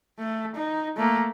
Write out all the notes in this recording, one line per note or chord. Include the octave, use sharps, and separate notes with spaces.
A3
D#4
A3 A#3